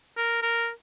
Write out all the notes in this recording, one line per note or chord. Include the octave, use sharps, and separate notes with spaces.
A#4
A#4